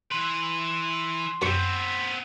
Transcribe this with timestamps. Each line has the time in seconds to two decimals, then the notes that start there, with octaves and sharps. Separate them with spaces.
0.12 E3 B4 C6
1.42 F#2 B3 C4 C#6